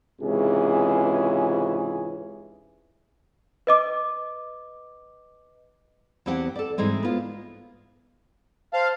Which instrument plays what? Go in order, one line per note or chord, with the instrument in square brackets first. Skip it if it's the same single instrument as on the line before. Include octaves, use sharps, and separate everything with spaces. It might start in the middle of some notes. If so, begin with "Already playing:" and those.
[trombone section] C#2 G#2 C3 E3 C#4 G#4
[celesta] B4 D#5 D6
[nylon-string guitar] E2 E3 C4 G4 F#5
A4 D5
G#2 E3 G3 G#3 C4
B3 F4 C5
[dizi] C5 [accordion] F5 [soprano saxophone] A5